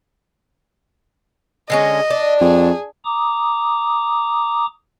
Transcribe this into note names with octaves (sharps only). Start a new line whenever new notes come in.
D3 G#3 C#4 D#5
D4
F2 G#4
A#5 D6 D#6